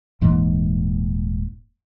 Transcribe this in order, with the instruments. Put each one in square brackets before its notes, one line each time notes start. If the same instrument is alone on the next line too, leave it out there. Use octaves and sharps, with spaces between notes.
[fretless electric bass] D#1 G#2 E3 A#3